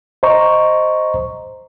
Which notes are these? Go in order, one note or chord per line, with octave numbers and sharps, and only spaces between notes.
C5 D#5 A#5 C#6